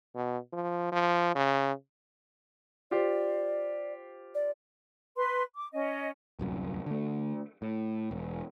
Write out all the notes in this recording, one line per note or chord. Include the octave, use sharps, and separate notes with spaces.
B2
F3
F3
C#3
F4 G4 C5 D5
D5
B4 C6
D6
C#4 D#5
D1 C2 F#2
D3 A3
A2
E1